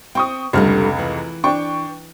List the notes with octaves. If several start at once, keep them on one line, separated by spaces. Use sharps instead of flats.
C4 G5 C#6 D#6
F1 C#2 D3 G3 A3 F6
E3
D4 G5 C#6